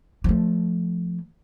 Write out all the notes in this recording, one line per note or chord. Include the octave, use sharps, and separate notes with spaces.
F3 A3